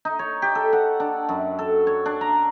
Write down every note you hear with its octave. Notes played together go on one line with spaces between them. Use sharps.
D#4
C#5
G4
A4
F#5
D4
F#2
A4
C#5
D4
A#5